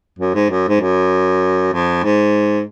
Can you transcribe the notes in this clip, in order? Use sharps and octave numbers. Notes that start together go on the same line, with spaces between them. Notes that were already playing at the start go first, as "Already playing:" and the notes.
F#2
G#2
F#2
G#2
F#2
F2
G#2